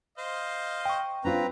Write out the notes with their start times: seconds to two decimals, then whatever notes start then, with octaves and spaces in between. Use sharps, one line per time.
0.18 C5 D#5 F5
0.85 G5 C#6
1.25 C4 D4 F4 B4 A#5